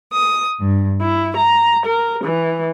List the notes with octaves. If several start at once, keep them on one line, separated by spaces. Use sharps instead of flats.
D#6
G2
E4
A#5
A#4
E3